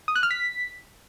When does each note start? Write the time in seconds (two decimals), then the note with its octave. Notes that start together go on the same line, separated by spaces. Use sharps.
0.08 D#6
0.16 F#6
0.23 F6
0.31 B6